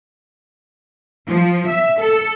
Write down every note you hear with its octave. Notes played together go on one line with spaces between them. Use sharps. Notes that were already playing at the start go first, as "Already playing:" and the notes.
F3
E5
A4